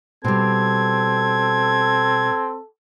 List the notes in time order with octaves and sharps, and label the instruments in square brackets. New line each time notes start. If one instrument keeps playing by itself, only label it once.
[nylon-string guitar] B2 G3 [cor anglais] C4 [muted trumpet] A4 [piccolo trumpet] G#6